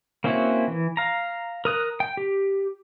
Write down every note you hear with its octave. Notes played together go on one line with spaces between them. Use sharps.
A#3 C4 C#4 E4 F#4
E3
F5 A#5
A#4 D#6 F#6
G5
G4